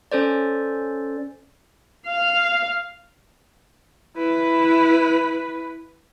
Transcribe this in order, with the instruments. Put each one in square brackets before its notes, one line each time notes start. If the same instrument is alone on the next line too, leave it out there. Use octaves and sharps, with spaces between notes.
[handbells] C#4 A4 C5 D5
[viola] F5
[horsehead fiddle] E4 B4